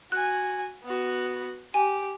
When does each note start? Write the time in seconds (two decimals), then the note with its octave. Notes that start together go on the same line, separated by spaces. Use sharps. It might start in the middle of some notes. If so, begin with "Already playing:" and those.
0.12 F#4 G#5 F#6
0.84 B3 F#4
1.74 G4 G#5